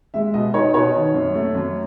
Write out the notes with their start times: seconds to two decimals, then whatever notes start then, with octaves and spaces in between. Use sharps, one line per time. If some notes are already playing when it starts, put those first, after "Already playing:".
0.14 G#3 E5
0.34 B2 D#5
0.54 D#4 C#5
0.74 B2 C#5
0.94 D#3
1.14 F#2
1.35 A3
1.55 F#2